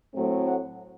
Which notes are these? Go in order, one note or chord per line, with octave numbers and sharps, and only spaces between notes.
A2 F#3 A3 C4
F#5